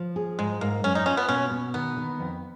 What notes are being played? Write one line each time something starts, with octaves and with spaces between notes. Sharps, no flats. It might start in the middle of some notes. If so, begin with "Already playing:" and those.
Already playing: F3
G#4
G#2 G#3
G#2 A#3
F#2 C#4
D#4
C#4 F4
B3
B2 C#4
B2
D#3 B3
D#3
F2